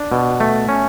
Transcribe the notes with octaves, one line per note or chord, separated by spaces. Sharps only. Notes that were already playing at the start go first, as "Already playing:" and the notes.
Already playing: D4
B2
A3
C#4